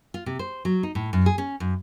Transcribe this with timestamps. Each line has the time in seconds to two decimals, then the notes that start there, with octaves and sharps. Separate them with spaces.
0.14 F4
0.26 C3
0.39 C5
0.65 F#3
0.83 D#4
0.95 A2
1.13 F#2
1.26 G#4
1.38 C#4
1.60 F#2